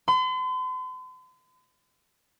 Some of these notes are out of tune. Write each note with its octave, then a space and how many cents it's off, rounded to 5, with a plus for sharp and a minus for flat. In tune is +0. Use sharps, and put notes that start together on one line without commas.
C6 -45